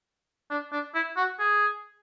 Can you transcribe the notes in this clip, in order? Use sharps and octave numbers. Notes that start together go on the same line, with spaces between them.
D4
D4
E4
F#4
G#4